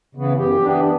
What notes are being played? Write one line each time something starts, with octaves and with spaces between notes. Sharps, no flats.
C#3 E3 B3
F#2 G4
E3 B3 D4